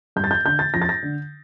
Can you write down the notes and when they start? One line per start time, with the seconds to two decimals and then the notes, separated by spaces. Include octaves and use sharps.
0.16 G2 G6
0.24 A6
0.31 G6
0.45 D3 G6
0.59 A6
0.74 F2 A#6
0.82 A6
0.89 A#6
1.02 D3